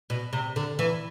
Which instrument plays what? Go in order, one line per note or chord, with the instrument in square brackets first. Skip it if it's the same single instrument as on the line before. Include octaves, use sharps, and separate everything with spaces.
[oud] B2
C3
D3
E3